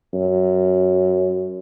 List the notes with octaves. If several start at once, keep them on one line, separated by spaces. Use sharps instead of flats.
F#2